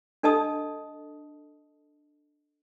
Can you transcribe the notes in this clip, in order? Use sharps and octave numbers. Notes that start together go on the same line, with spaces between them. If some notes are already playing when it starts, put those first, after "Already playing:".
D4 A4 D#5 A5 D#6